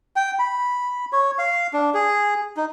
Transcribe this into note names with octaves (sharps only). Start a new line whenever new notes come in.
G5
B5
C#5
F5
D4
G#4
D#4